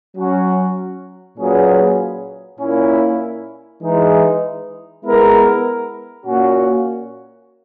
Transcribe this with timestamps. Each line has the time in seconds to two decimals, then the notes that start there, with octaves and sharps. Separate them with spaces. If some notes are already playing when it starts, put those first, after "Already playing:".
0.15 F#3 C#4 F#4
1.37 A#2 F#3 C#4 G#4 B4
2.59 A#2 A#3 C#4 E4
3.82 E3 G#3 D#4
5.04 G#3 B3 E4 A#4
6.26 A#2 A#3 C#4 F#4